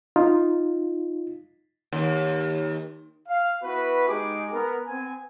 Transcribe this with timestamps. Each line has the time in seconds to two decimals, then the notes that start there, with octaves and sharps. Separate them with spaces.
0.16 D#4 F4
1.93 D#2
3.28 F5
3.63 B3 E4 F#4 B4
4.08 G#3 D#4 G4 G#4 D6
4.53 B3 A#4
4.86 B3 C4 G#5